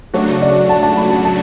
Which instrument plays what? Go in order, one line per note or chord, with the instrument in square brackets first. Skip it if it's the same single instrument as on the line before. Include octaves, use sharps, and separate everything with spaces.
[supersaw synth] C#3 F#3 A3 D4 F#4 [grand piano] C#5
[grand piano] D5
A5
A5
B5
A5
A5